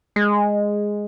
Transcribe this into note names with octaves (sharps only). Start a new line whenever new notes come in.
G#3